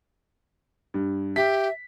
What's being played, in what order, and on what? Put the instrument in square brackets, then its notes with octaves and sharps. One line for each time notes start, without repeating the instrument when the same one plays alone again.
[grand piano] G2
[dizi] G4 [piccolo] E5 [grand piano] B6